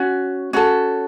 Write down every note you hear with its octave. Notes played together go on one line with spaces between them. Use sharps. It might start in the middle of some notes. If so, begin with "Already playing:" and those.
Already playing: C#4 F#4
C#4 F#4 A4